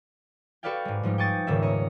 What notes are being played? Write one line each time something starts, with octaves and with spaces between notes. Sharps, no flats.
F#4 A4 B4 D5 F5 G5
G#2 G#3
G#2 F3 G3 D#4
G5 G#5 C#6 D#6 A6
D#1 D#2 G#2 C#3 G#4 E5
C#5 D#5 A#5